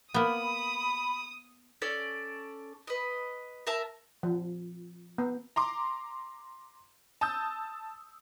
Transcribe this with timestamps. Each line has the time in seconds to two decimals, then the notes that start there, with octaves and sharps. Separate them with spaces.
0.14 A#3 B3 B5 D#6
1.82 C#4 A4 D5
2.87 B4 D#5
3.67 A#4 E5 A5
4.23 F3
5.18 B3
5.56 A#5 C6 D6
7.21 A5 D#6 E6 G6